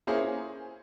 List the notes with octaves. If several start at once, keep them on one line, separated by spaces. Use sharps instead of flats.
A#3 C#4 E4 G#4 C5